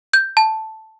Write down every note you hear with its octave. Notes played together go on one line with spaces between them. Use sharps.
G6
A5